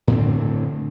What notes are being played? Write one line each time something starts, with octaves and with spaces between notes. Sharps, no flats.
A2 D3 C4